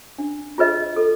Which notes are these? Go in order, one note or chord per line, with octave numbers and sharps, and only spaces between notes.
D4
F4 G#4 B4 D#5
A4